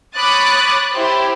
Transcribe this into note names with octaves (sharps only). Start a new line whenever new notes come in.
C#5 B5 D6 D#6 F#6 A6
E4 G4 C5